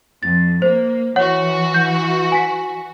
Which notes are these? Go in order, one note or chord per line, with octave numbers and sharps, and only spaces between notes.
F2 A6
A#3 C5
E3 F#4 C#5 F#5
G6
G#5 B6